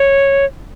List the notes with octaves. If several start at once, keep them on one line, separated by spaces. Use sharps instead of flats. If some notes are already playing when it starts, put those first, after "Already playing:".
Already playing: C#5